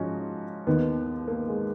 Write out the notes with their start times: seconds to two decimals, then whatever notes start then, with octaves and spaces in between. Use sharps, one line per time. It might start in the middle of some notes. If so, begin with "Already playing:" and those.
Already playing: G#2 F3 C#4 D#4 F#4
0.67 D#2 D#3 B3
1.28 A#3
1.48 G#3